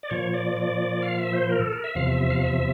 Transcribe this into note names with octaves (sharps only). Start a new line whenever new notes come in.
D5
A#2 F3 C#5
D5
D5
F5
E5
C5
A#4
A4
A#4
E5
E2 C3 F3 F5
E5
E5
F5
E5